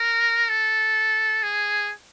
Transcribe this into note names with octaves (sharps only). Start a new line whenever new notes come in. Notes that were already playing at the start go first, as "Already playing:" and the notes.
Already playing: A#4
A4
G#4